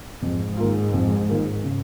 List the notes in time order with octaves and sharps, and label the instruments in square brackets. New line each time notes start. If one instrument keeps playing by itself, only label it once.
[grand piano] F2 [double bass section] G#2
[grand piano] D#3 A#3 F4
F2
D#3 A#3 F4
C#3